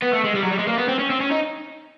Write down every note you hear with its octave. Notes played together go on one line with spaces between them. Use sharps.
B3
A3
G#3
G3
F#3
G3
G#3
A#3
B3
C4
C#4
C4
C#4
D#4